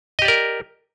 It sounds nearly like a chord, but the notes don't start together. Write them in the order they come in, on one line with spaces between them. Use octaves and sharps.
D#5 G4 D5 A#4